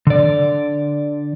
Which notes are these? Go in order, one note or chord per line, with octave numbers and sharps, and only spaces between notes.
D3 D5